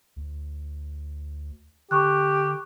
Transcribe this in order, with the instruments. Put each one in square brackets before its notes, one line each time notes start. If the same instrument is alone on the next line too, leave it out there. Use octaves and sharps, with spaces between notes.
[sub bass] D2
[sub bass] D3 [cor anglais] G4 [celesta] C#6 F#6